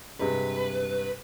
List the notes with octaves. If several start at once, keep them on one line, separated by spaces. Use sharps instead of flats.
G2 C3 G#3 B4